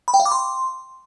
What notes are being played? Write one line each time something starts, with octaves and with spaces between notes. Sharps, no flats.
B5
G5
F5
D6
C6